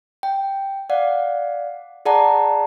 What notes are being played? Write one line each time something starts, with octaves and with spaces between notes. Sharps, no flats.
G5
D5 F5 F#5
G#4 D5 F#5 A5 A#5